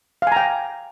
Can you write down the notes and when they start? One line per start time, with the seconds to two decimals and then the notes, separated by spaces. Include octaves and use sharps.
0.22 F5
0.27 G#5
0.32 A#5
0.37 G5